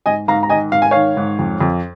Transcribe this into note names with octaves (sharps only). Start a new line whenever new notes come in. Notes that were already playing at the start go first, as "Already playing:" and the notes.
G#2 D#5 G#5
G#2 F5 A#5
A#5
D#3 D#5 G#5
G#2 F5
G#5
D#3 C#5 F5
G#2
F2
F2